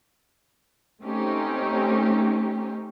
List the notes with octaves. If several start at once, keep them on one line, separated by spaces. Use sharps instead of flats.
A3 C4 C#4 D#4 G4